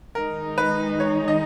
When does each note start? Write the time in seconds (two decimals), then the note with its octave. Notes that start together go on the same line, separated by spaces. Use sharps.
0.15 D#3 G#3 D#4 A#4
0.58 B4
1.00 C#5
1.28 D#5